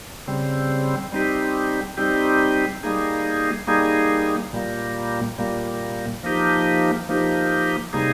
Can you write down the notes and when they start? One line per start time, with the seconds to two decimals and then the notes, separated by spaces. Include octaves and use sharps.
0.27 C#3 G3 C4
1.12 G3 C4 D#4 G4
1.97 G3 C4 D#4 G4
2.83 G3 A#3 D#4 G#4
3.67 G3 A#3 D#4 G#4
4.53 A#2 G3 A#3
5.38 A#2 G3 A#3
6.23 F3 A#3 D#4 G4
7.09 F3 A#3 D#4 G4
7.93 C3 G3 A#3 D#4 G#4